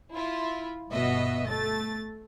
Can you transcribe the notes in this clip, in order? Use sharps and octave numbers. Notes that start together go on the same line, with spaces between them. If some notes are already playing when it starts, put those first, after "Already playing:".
E4 F4
G1 B2 B3 D#5 E5
A3 A6